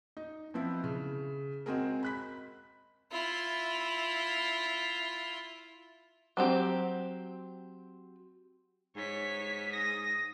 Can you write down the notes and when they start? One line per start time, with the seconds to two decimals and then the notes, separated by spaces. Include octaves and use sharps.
0.17 D#4
0.54 F3 B3 C4 E4
0.84 C#3
1.66 G#3 C4 F#4 G#4 A#4
2.03 B5 F#6 B6
3.12 E4 F4
6.37 F#3 C4 G4
8.96 G#2 C#5 B6
9.73 D#6 A#6